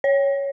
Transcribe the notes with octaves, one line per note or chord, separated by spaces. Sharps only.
C#5